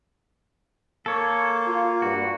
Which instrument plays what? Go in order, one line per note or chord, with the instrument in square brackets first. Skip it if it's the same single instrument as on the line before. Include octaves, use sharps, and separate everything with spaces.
[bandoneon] A#3 [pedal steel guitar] A4 C#5
[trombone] F4
[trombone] G2 [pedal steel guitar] F#4